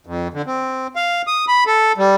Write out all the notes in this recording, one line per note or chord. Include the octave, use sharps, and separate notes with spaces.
F2
D3
C4
F5
D#6
B5
A4
G3